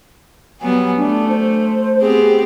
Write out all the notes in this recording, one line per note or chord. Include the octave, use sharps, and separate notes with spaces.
F#3 G3 B3 G#5
A3 D4
C5
B3 C4 G4 G#4